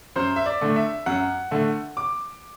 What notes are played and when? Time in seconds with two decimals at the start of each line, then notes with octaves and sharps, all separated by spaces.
0.16 F#2 C5
0.36 E5
0.46 D5
0.61 D3 A3
0.76 E5
1.06 F#2 F#5
1.51 D3 A3
1.97 D6